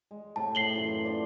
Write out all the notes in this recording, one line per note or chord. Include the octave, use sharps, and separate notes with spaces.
G#3
A2 C3 A5 C#6
A2 C7 F#7 G7
F#2 E3 F4
D4 B4 C5